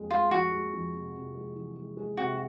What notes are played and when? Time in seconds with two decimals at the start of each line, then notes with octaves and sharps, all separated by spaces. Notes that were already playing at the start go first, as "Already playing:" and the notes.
Already playing: F2 G#3
0.11 G#3 F4
0.31 F2 F#4
0.52 G#3
0.73 F2
0.93 C3
1.14 C3
1.35 G#3
1.55 E3
1.76 G#3
1.97 G#3
2.17 C3 F#4